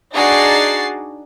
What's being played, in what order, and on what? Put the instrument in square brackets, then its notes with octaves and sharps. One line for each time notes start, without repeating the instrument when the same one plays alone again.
[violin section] D4 D#4 F#4 G#4 A6 C7